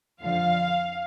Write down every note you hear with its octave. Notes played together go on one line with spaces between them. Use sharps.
F2 D3 F3 F5